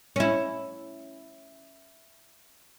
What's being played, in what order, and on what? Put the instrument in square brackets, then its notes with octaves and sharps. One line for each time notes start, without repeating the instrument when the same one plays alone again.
[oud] C#4 E4